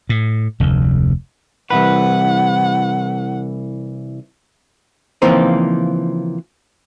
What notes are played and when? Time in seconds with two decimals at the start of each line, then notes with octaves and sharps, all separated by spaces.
0.09 A2
0.60 F1 D2
1.70 C2 E3 B4 F#5
5.22 C#3 E3 F3 A#3 C4 D#4